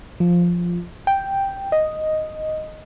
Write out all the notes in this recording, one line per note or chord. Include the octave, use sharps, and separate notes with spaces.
F3
G5
D#5